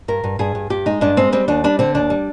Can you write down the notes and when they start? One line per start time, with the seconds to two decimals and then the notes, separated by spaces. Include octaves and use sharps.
0.08 G2 A#4
0.24 G2
0.39 G2 G#4
0.55 G2
0.70 G2 G4
0.86 G#3 D#4
1.01 G2 D4
1.17 G#3 C4
1.32 G3 C4
1.48 D#2 D4
1.64 G3 D4
1.79 D3 C4
1.95 D#2 D4
2.10 G3